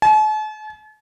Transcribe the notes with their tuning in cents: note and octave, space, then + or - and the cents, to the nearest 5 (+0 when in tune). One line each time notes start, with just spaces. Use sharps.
A5 -45